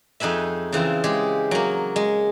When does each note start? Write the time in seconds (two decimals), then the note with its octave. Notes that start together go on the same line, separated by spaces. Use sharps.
0.20 F2 D#4 G#4 B4 E5
0.72 C#3 E3 C4 F4
1.04 G#3 G4 G#4
1.51 F#3 A#3
1.96 G#3